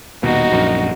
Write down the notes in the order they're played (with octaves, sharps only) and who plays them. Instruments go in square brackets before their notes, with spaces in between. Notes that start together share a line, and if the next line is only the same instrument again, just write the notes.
[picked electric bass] D#1 D#2 B2 [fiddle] D#4 F#4
[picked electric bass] A#1 F#2